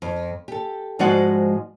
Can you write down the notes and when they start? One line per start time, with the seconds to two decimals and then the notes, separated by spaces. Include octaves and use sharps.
0.02 F2
0.48 G4 A4
0.99 G#2 F3 G#3 F#4 D5 F#5